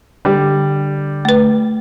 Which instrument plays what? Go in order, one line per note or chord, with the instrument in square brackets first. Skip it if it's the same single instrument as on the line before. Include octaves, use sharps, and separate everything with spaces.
[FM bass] D3 [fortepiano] G3
[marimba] A3 B4